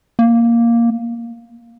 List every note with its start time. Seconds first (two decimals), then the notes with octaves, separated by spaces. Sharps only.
0.19 A#3